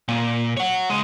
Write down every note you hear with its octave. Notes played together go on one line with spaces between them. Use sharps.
A#2
C#5 F#5
C#2 G#3